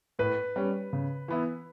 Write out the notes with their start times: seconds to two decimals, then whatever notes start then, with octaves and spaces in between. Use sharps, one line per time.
0.19 A2 B4
0.56 G3 C#4
0.93 C#3
1.28 E3 B3 E4